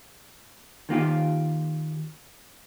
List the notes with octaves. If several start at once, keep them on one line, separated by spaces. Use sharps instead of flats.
D#3 A#3 F4 G4